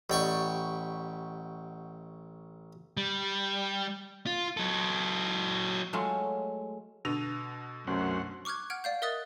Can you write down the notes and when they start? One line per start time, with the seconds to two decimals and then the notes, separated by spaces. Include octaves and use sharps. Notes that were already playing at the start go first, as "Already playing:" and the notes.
0.10 A1 G3 D#5 F#5 G5 C#6 G6
2.97 G3
4.26 F4
4.57 F#3 A4
5.93 F#3 G#3 A3 F4
7.05 B2 D3 E6 A#6 D#7 F7
7.87 C2 F#2 F#3 A3 C#4 C5 F#5
8.45 C#6 D6 F6 F#6 G#6
8.70 F#5 F6 G#6 D7
8.84 D5 F5 G6
9.02 A#4 D#5 E5 D#6 F#6 A6